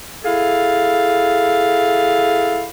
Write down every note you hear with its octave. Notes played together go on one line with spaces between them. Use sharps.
E4 G#4 A4 F5